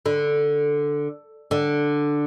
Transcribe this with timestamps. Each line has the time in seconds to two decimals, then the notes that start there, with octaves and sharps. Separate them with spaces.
0.06 D3
1.51 D3